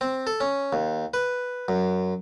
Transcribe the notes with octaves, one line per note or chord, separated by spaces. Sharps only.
C4
A4
C#4
D#2
B4
F#2